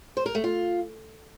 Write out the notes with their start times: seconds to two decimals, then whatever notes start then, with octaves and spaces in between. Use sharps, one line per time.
0.17 C5
0.26 A#4
0.35 A3
0.44 F4